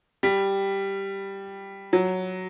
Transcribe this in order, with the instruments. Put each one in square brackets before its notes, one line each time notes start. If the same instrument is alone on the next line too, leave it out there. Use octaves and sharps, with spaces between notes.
[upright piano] G3
F#3